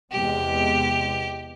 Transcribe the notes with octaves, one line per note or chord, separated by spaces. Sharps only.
E2 C3 G#3 G4